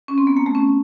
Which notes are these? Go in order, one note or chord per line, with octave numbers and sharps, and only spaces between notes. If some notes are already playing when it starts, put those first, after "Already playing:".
C#4
C4
B3
A#3
A3
C#4